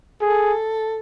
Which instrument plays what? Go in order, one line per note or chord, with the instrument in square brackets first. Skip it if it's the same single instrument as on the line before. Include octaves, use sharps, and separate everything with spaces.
[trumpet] G#4 [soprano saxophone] A4